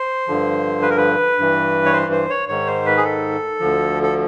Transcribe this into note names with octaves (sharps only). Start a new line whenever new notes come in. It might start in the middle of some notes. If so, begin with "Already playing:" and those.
Already playing: C5
G2 D3 F3
B4
A#4
B4
G2 E3
C#5
C5
C5
C#5
G#2 D#3 C#5
C5
B4
G#4
A4
D2 D3 F3
A4